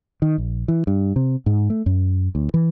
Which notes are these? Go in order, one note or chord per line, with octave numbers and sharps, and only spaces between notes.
D#3
A#1
E3
G2
C3
G#2
A3
F#2
D2
E3